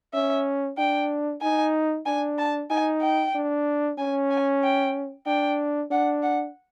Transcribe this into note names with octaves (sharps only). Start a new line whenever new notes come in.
C#4 E5
D4 G5
D#4 G#5
D4 G#5
A5
D#4 G#5
G5
D4
C#4 G#5
G#5
G5
D4 G5
D4 F#5
F#5